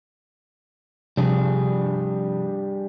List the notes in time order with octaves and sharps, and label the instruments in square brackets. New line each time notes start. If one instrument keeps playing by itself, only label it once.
[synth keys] C3 F3 [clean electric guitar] G3 D4 G#4